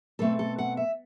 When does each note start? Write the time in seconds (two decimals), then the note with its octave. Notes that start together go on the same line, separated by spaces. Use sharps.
0.19 B2 A3 C4 A4
0.39 A4
0.58 F#5
0.77 E5